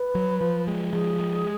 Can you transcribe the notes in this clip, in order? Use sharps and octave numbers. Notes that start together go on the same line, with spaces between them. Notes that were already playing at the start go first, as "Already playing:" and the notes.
Already playing: B4
F#3
F3
G#3
F3 G#4
G#3